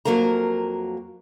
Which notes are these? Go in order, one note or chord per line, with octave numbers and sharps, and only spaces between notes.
F2 G#2 F#3 A#3 A#4 A#5